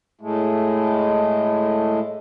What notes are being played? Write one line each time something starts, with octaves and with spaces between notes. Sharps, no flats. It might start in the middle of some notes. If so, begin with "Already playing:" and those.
A2 G#3 A3